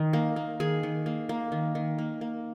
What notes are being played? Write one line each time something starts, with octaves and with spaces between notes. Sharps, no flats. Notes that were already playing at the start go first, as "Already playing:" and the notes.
Already playing: D#3
A#3
A#3
D#3 G#4
D#3
A#3
A#3
D#3
D#3
A#3
A#3